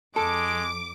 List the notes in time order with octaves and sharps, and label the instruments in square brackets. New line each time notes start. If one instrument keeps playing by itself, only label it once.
[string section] F2 D6 [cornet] G#3 [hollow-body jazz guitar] A4